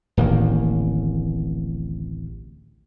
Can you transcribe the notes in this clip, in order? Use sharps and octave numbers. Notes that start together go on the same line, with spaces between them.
D1 A1 D#3 A#3